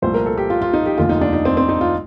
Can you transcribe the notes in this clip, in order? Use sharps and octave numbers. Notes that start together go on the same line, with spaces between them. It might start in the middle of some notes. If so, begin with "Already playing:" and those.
C2 A#2 F3 A3 C5
A#4
A4
G4
F4
F4
D#4
G4
F1 D#2 D3 F3 F4
D#4
D4
D#4
C4
C4
D#4
F4